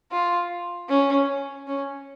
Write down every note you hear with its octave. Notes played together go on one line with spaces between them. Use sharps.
F4
C#4
C#4